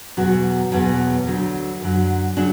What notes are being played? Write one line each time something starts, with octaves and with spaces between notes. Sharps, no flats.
E2 B2 F#3 F#4
E2 B2 F#3
D2 D3 F#3
F#2 D3 F#3
C#3 F#3 D4